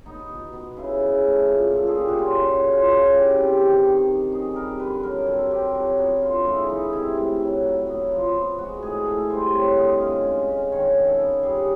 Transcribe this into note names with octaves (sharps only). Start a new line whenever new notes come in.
B3 D#4
B2
B3
C#3 E4
C#3
A3
A#2
A#2 A4
G#4
A#2 G4
F#4
C#3 F4
F#4
C#3
F#4
C#3
F4
C#4 F#4
E3 G4
C3 G4
D#3
D#3
D#3
D#4 G#4
G3 A#4
D3 B4
F#3 A#4
A#4
C3 A4
C3 G4
F#3 F#4
B3 F#4
D3 F4
G#3 E4
E3 D#4
C3 E4
A2
F#3
F#3
B3
F3
B3
G#3 F#4
A2 G#4
A2 A4
G3 C5
C4 C#5
D3 D#5
C#4 F5
G#3
C#4
D#3 C#5
D#3
A4
B3
G3 G#4